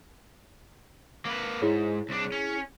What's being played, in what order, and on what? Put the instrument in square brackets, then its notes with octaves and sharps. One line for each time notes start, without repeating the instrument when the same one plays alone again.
[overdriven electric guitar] A#3 B4
[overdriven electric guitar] G#2 [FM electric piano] E4 G#4 C#5
[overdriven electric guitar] C2 D4
C#4